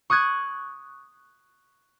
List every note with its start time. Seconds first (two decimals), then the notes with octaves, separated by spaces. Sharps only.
0.10 C#6 D#6 F#6 G#6